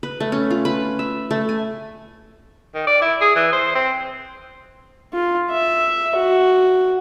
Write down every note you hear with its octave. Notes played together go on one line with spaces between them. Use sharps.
B4
A3
C#4
F4
B4
E5
A3
G#5
D#3
D5
E4
G#4
E3
C5
C4
F4
E5
F#4